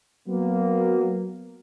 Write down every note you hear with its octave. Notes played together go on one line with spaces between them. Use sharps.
F#3 A#3 B3